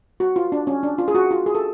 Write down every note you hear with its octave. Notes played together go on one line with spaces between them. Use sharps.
F#4
F4
D4
C#4
D4
F4
G#4
F#4
F4
G#4
A4